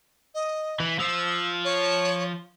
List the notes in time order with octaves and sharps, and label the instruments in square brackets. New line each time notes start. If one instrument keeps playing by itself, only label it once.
[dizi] D#5
[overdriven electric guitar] E3
[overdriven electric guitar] F3 [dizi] E6
[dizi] C#5